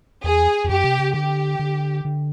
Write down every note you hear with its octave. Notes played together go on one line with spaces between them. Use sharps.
E2 G#4
F2
F#2 G4
C3
C#3
D3 G4
D3
D3